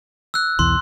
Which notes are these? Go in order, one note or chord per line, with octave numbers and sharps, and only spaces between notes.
E6 F#6
B1 E2 E3 C6